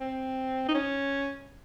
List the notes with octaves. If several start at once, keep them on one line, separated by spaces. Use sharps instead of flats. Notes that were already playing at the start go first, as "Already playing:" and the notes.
C4
D#4
C#4